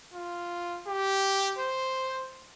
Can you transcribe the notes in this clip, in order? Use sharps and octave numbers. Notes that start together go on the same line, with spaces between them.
F4
G4
C5